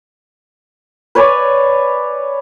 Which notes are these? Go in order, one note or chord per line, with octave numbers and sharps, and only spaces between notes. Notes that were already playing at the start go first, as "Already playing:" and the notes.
B4 C#5 D5 G#5